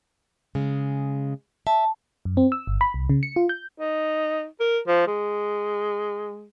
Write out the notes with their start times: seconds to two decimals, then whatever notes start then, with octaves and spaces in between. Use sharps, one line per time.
0.55 C#3 G#3
1.67 E5 A5
2.25 F#2
2.37 C4
2.52 E6
2.67 G1
2.81 B5
2.94 C2
3.10 C#3
3.23 C#7
3.36 F4
3.49 G6
3.80 D#4
4.60 A#4
4.88 F3
5.07 G#3